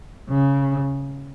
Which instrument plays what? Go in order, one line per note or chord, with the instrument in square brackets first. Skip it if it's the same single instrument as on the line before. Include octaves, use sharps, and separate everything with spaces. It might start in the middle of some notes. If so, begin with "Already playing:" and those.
[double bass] C#3